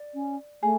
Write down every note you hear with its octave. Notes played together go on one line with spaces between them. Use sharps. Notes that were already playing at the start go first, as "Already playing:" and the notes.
Already playing: D5
C#4
A3 G#4